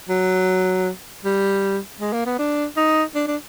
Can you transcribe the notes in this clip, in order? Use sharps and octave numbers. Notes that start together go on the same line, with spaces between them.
F#3
G3
G#3
A#3
B3
D4
D#4
D4
D4